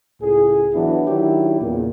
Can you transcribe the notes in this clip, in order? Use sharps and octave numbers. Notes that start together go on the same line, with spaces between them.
C#2 A2 G#4
E3 F#3 B3 D4 E4 F#4
D#3 F#3 D4 E4 G4
E2 A#2 C#3